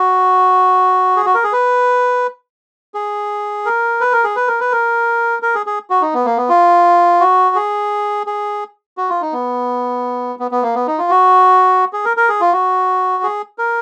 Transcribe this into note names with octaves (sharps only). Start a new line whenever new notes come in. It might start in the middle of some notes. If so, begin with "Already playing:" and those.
Already playing: F#4
G#4
F#4
A#4
G#4
B4
G#4
A#4
B4
A#4
G#4
B4
A#4
B4
A#4
A#4
G#4
G#4
F#4
D#4
B3
A#3
B3
F4
F#4
G#4
G#4
F#4
F4
D#4
B3
B3
B3
A#3
B3
D#4
F4
F#4
G#4
A#4
A#4
G#4
F4
F#4
G#4
A#4